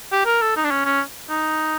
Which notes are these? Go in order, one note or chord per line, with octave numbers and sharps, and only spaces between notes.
G4
A#4
A4
D#4
D4
C#4
C#4
D#4